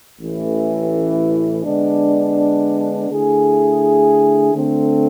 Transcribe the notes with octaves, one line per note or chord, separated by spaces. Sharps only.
A1 A2 E3
D3 G#3 B3 D4
D3 A3 E4 G#4
D3 A3 C4